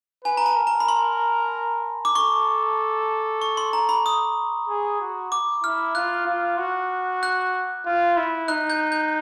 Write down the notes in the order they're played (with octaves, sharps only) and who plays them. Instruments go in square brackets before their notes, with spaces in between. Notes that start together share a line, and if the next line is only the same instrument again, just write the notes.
[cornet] B4 [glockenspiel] G#5
[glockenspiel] A#5
A5
[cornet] A#4
[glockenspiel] A#5
B5
C6
D6
[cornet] A4 [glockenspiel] C#6
[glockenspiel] C#6
C6
A#5
B5
D#6
[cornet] G#4
F#4
[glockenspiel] D6
[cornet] E4 [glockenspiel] F6
[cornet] F4 [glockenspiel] F#6
[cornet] F4
F#4
[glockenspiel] F#6
[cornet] F4
E4
[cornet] D#4 [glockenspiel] F#6
[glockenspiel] G6
G6